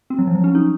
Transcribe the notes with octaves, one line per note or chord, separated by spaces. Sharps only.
C4
F#3
F3
F#3
C#4
D#4